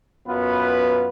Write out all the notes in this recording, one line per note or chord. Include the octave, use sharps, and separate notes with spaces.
F#2 B3 F4 B4